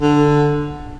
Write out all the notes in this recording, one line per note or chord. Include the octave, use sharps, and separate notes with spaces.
D3